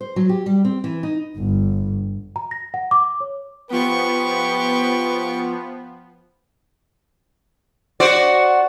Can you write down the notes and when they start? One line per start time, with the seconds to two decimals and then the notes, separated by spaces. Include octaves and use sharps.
0.01 C5
0.16 F#3
0.29 G4
0.46 G3
0.65 C4
0.84 E3
1.03 D#4
1.35 G1
2.36 A#5
2.51 A#6
2.74 F#5
2.91 D6
3.20 C#5
3.70 F3 B3 G4 B4 C#6
8.00 F#4 C5 D5